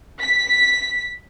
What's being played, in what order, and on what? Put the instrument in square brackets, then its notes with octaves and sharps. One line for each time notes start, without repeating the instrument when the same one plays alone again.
[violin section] B6